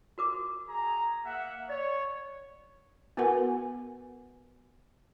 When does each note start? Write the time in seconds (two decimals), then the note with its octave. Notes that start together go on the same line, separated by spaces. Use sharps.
0.18 F#4 A#4 D6
0.68 G#4 A#5
1.25 A#3 E5 F#5
1.69 C#5 D5
3.17 B3 F#4 A#4 B4 F#5 G#5